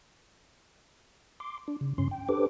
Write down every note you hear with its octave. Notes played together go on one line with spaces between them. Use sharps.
C6 D6
D4
C#3
G2 C#3 C#4 C6
G5
D4 G4 A4 B4 C5 D6